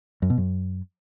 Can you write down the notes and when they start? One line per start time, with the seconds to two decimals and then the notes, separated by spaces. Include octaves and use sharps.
0.22 F#2
0.30 B2
0.38 F#2